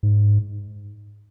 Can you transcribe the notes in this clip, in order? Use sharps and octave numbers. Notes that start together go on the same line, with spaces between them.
G#2